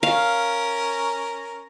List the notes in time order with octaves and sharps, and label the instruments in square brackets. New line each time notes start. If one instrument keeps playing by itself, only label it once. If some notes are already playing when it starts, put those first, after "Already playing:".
[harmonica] C#4 A#4 [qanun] F5